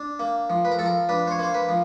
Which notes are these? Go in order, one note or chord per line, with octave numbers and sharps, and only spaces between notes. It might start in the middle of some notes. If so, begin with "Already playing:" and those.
Already playing: D4
A#3
F3
B4
A#4
F3 A4
A#4
D4 B4
C5
C#5
A#3 C5
B4
F3